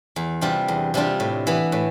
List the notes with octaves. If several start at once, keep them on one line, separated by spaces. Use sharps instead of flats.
E2
C3 G3 D4 F4
E2
C3 G3 D4 F4
A2
E3 B3
A2